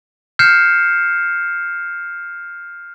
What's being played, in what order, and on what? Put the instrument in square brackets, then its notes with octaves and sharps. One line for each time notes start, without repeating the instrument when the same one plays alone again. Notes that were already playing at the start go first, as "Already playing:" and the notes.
[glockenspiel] F6 G6 C7 C#7 E7